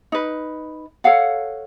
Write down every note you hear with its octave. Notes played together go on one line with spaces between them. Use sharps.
D#4 B4
A4 C#5 F5 F#5